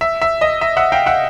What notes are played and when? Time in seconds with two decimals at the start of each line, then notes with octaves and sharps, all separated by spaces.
0.01 E5
0.22 E5
0.41 D#5
0.61 E5
0.77 E5 F#5
0.92 F5 G5
1.06 E5 F#5